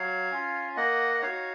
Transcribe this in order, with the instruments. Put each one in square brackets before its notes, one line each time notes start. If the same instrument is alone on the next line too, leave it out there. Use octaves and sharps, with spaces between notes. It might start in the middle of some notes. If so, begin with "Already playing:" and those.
Already playing: [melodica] F#3 C#5 F5
C#4 F4
A#3 D#5 F#5
F#5
D#4 F#4 C#5 F5